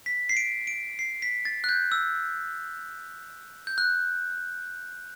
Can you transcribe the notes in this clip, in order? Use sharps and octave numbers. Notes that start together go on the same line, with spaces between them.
B6
C7
D7
D7
C7
B6
A6
F#6
G6
E6
G6
F#6